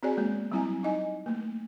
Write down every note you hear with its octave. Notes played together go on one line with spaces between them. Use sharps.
C4 F#4 G#4 C#5 D5 G#5
G#3 A#3 B3
F#3 G3 C4 E4 G#5 A#5
D#4 D#5 G#5
A3 A#3